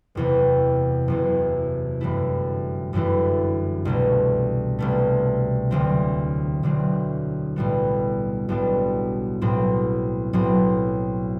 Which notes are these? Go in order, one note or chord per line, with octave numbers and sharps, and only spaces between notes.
F#1 E2 C3
F#1 E2 C3
G1 F#2 E3 A3 E4
G1 F#2 E3 A3 E4
C2 B2 A3
C2 B2 A3
E1 D2 D3 F#3 C4
E1 D2 D3 F#3 C4
B1 A2 G3 B3 D4
B1 A2 G3 B3 D4
B1 A2 F#3 C4
B1 A2 F#3 C4